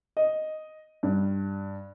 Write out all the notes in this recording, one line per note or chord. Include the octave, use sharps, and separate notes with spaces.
D#5
G2